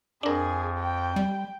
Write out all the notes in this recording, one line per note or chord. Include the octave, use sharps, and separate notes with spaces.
F2 D4 G#4 A#4
G5
G3